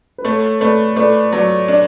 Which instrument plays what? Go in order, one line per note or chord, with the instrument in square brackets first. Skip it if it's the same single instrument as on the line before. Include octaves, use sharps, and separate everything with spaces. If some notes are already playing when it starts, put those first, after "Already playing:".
[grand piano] B4
[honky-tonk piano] A3 [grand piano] A4 C#5
[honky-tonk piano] A3 [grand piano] B4 D5
[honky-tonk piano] A3 [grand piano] B4 D5
[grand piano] C#5
[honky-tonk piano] F#3 [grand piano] B4 D5
[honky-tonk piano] D4